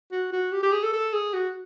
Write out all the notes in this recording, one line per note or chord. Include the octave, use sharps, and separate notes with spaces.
F#4
F#4
G4
G4
G#4
A4
A4
G#4
F#4